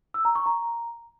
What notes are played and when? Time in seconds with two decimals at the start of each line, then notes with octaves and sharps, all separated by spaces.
0.14 E6
0.25 A#5
0.35 C#6
0.46 A#5